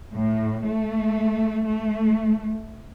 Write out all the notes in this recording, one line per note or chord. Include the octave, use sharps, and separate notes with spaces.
A2
A3
A3